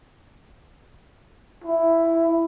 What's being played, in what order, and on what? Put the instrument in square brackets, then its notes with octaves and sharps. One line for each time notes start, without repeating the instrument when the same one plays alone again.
[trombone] E4